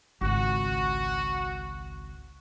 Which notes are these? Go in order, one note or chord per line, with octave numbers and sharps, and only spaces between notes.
G#1 C#2 F#4